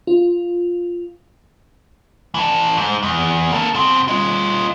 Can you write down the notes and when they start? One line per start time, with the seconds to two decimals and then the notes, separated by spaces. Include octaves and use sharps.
0.07 F4
2.35 E3 A4
2.77 G#2
3.03 E2
3.52 A#3 A4
3.74 B2 C4
4.08 F4 D#5